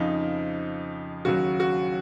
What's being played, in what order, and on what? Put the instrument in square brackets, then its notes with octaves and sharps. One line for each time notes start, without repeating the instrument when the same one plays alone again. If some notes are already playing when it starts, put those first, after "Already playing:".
Already playing: [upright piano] F2 C#3 F3 D#4
D#2 C#3 F#3 F#4
F#4